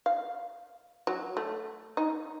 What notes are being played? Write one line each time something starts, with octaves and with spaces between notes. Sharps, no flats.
F5
F#3
A3
D#4